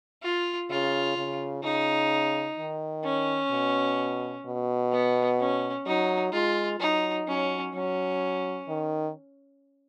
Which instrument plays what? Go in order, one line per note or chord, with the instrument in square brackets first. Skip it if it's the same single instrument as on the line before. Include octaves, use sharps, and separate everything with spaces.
[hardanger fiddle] F4
[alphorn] C#3 [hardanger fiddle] F4
[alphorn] C#3
[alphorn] C#3 [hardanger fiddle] D#4
[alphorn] D#3
[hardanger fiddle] C#4
[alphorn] B2
B2
[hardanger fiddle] B3
C#4
[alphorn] F#3 [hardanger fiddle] D#4
[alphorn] G#3 [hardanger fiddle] F4
[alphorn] F#3 [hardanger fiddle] D#4
[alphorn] F#3 [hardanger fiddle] C#4
[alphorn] F#3 [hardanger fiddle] C#4
[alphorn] D#3